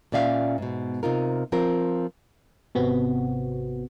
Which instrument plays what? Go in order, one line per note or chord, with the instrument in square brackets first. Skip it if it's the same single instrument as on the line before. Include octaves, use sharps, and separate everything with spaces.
[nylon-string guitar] A#2 C#4 D5 E5 F5
G#2 B2
C3 D#4 F4 A#4
F3 C4 F4 A#4
[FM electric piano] G#1 C3 B3 C4 F#4